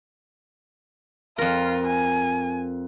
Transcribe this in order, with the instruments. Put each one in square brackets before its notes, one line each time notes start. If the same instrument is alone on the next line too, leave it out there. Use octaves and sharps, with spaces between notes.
[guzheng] F2 A#4 [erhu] F4
[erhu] G#5